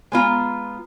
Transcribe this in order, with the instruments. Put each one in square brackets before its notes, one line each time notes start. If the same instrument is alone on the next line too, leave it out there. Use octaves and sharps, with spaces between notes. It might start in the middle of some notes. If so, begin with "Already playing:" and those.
[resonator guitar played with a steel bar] G#3 B3 F4 A#5